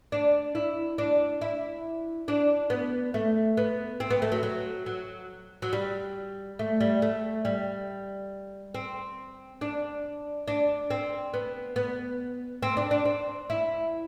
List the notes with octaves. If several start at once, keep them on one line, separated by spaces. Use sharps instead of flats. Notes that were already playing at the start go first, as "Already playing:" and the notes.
D4
E4
D4
E4
D4
B3
A3
B3
C4
B3
A3
F#3
F#3
F#3
F#3
G3
A3
G3
A3
G3
C4
D4
D4
C4
B3
B3
C4
D4
D4
C4
E4